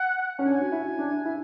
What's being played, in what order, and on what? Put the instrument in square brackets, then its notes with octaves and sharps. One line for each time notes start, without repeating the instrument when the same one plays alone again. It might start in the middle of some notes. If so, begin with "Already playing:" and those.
Already playing: [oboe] F#5
[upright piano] C#4
[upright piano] D4 [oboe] G#5
[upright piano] F#4
E4
D4
E4